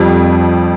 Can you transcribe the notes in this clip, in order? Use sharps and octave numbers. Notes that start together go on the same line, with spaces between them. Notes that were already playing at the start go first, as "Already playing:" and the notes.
Already playing: F2 F3 G3 C4